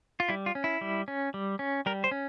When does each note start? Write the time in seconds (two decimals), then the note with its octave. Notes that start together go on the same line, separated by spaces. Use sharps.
0.20 F4
0.29 G3 E4
0.46 F4
0.55 C#4
0.64 E4
0.81 G3
1.08 C#4
1.34 G3
1.59 C#4
1.86 G3 A#4
2.04 C5
2.11 C#4